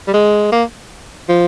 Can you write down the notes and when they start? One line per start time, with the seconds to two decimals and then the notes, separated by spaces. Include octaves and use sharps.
0.08 G3
0.14 G#3
0.52 A#3
1.29 F3